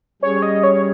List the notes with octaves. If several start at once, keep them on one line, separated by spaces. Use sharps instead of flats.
G3 C#4 G#4 C#5
D#5
C#5